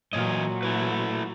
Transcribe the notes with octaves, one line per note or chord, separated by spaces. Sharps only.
A#2 E3 F#3 C#5 D#5
A3 E4 B4